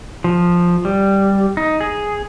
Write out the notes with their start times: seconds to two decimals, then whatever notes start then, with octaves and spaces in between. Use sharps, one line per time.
0.24 F3
0.85 G3
1.57 D#4
1.81 G#4